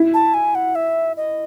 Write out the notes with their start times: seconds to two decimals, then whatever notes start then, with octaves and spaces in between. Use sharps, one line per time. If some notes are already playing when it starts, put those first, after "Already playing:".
Already playing: E4
0.14 A5
0.34 G#5
0.55 F#5
0.75 E5
1.17 D#5